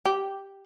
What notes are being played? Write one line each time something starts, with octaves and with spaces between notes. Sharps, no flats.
G4